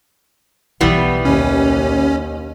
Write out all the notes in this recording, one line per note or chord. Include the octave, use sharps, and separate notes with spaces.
B1 C#3 E3 G3 B3
D#2 C#4